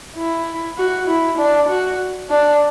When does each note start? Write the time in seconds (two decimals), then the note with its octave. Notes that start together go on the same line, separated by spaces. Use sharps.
0.16 E4
0.77 F#4
1.07 E4
1.38 D4
1.69 F#4
2.30 D4